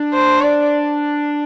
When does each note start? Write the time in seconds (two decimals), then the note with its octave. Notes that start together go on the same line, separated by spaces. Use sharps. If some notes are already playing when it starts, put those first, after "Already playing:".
Already playing: D4
0.13 C5
0.42 D5